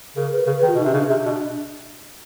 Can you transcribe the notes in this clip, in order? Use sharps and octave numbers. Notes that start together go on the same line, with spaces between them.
C#3 A#4
B4
C#3
B4
D#3
F4
B2 D#4
C3 C#4
C#3 D4
C3
B2